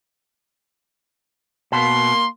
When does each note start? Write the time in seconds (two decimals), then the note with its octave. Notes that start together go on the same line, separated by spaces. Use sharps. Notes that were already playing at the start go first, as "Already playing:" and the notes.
1.72 B2 A#3 C6